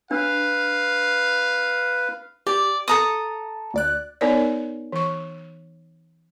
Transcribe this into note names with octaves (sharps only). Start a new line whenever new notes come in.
D4 B4 F5
G4 D5
A4 A#5 D#6
D2 D5 F#6
B3 D#4 A#4 C#5 D5
E3 C#6